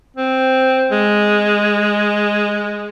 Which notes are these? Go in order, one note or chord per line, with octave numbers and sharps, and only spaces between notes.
C4
G#3